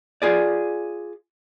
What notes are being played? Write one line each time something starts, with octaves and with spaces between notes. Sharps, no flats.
F4 G#4 D5